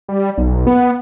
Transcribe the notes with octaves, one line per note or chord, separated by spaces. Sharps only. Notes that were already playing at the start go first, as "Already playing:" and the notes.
G3
B1
B3